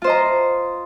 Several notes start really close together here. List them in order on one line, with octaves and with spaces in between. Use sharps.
F4 C5 D#5 A#5